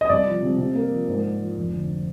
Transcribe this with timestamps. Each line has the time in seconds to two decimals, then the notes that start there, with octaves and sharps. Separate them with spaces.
0.01 D#5
0.09 C2 D5
0.26 F3
0.42 C3
0.58 C3
0.75 A#3
0.91 F3
1.08 G#2
1.24 G#3
1.40 F3
1.56 F1
1.73 D3